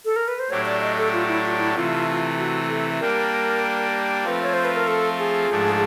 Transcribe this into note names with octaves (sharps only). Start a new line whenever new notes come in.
A4
A#4
B4
C5
A2 F#3 A3 D4 G4 C#5
D5
D#5
A4
F4
E4
F4
E4
C3 E3 A3 F4
F#4
A4
G3 A#3 D4 G4 A#4
F3 A3 C4 F4 B4
C#5
C5
B4
A#4
A4
G#4
G#2 F3 A3 D4